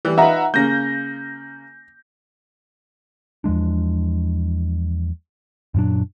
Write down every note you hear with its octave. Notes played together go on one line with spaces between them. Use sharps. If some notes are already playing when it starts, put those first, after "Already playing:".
E3 G3
D#4 F4 B4 E5 F#5 A#5
C#3 A#3 G6 A#6
E2 F3 G#3 D4
F#2 A#2 F#3 D4